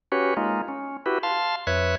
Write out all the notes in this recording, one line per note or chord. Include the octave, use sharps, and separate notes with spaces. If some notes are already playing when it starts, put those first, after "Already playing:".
C#4 F#4 G4 B4 C#5
G#3 A#3 D#4 F4
C#4
E4 F#4 G4 B4
F5 A5 C6
F2 B4 C#5 E5 F#6 G#6